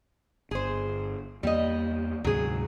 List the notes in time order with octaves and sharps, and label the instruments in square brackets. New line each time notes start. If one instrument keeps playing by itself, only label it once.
[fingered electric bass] G1 [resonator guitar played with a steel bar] G#4 C5
[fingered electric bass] E2 A#3 [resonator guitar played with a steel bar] G3 D#5
[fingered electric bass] D2 G#2 C3 [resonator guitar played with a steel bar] F#3 G#4